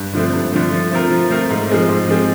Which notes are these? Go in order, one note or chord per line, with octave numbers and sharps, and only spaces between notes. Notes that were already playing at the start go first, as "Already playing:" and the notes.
Already playing: G2
D3 F3 A3 C4
G2
D3 F3 A3 C4
F3
A3 C4 F4 A#4
F3
A3 C4 F4 A#4
G#2
F3 G#3 C4
G#2
F3 G#3 C4